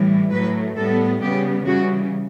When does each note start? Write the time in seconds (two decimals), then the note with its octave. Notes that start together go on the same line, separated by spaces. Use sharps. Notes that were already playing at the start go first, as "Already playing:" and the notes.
Already playing: A2 E3 G3
0.32 A2 F#3 A3 B4
0.76 A2 G3 B3 A4
1.20 C#3 G3 B3 G4
1.65 C#3 E3 G3 F#4